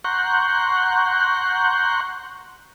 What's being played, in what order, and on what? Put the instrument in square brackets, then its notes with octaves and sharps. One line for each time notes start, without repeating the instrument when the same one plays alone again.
[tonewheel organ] F#5 A#5 C6 C#6 F#6 G6